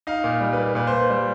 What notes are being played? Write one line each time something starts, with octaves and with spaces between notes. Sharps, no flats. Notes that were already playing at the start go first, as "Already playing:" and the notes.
D#4 F5
A#2
G3
B4
A#3
A#2 B4
C5
A#2
B4
G3